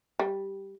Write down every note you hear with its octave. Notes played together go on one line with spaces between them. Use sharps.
G3